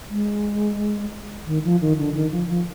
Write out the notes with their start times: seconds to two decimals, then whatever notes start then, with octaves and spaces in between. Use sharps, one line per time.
0.10 G#3
1.47 D#3
1.64 F3
1.81 D#3
1.98 D3
2.15 D#3
2.32 F3
2.48 F3